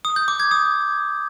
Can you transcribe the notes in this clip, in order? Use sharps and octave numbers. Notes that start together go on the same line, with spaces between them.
D#6
G6
D6
G#6
D#6